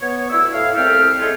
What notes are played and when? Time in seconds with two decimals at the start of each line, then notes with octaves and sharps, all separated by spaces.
0.01 B3 C#5
0.30 D2 E4 E6
0.53 A2 F5
0.75 C2 A3 C4 G4 A4 F6
1.20 A2 G#3 C4 C#4 F4 A4